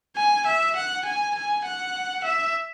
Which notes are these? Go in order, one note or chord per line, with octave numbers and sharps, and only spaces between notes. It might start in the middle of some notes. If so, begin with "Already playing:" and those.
G#5
E5
F#5
G#5
G#5
F#5
E5